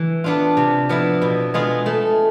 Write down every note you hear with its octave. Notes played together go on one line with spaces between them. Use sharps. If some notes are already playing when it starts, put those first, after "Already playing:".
Already playing: E3
B3 D4 F4
C3
F3 B3 E4
B2
G#3 B3 F4 G#4
A3